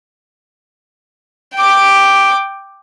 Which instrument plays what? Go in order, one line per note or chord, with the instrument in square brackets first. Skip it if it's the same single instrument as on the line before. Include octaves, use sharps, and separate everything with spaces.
[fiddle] G5 D6